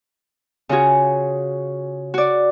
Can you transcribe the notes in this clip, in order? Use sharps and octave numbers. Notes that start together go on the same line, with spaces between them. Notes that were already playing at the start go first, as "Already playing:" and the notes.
C#3 F4 F#4 G#4
F#4 D5